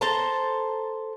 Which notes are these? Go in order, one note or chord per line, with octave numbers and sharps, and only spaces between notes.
A4 C5 A5 A#5